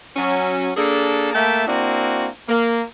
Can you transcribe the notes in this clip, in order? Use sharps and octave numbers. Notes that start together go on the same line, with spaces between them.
F#3 C#4
A#3 D4 G#4 A4
A3 A#3 E5 G5 A5
A#3 C4 D4 E4 F#4
A#3